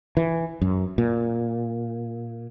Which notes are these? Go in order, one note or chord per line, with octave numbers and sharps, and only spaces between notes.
E3
F#2
A#2